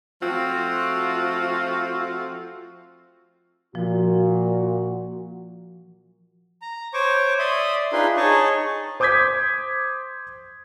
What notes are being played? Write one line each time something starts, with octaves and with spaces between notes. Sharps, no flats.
F3 A3 C4 F4 F#4
A#2 F3 F#4
A#5
C5 C#5 C#6 D6
D5 E5 C6 D#6
D4 D#4 F4 G#4 B4 C6
D#4 G#4 C#5 D#5 A5 C#6
C5 D6 D#6 G6 G#6 B6